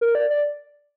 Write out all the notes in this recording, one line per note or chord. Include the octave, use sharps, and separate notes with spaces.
A#4
D5
D5